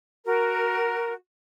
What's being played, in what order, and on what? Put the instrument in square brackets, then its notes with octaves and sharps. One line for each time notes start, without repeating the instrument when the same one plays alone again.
[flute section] F#4 A#4